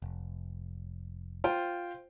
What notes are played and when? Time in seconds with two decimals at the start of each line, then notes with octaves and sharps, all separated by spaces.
0.02 F1
1.44 F4 C5 G5